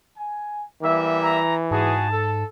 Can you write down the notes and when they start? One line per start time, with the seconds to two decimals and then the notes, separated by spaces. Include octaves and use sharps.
0.17 G#5
0.82 E3 G3 A#3 E5
1.22 A#5
1.71 G#2 E4 F#4 G#4 A5
2.11 A4